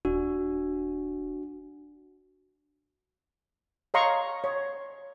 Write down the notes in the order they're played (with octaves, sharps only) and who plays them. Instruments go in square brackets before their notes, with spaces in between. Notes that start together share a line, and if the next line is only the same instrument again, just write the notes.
[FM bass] D#1 [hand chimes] D4 [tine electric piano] F#4
[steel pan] C#5 D#5 F5 A#5 C6 C#6
C#5